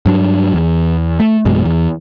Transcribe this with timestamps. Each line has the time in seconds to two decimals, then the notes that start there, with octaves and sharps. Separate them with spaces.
0.06 G2 F#3 D4
0.54 E2
1.20 A3
1.45 A1 F#2 B2 G#3
1.65 E2